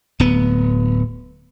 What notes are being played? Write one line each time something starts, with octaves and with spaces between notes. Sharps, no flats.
D1 B3